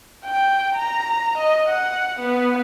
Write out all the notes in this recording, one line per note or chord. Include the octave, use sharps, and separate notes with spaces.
G5
A#5
D#5
F#5
B3